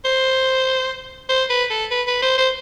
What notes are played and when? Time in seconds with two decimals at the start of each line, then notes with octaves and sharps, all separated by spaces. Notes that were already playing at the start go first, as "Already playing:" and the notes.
0.05 C5
1.29 C5
1.50 B4
1.70 A4
1.91 B4
2.07 B4
2.22 C5
2.38 C5